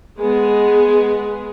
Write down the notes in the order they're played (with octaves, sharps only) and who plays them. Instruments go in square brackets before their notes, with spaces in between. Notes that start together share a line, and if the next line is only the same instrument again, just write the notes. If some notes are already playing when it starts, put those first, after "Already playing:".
[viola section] G#3 B3 G#4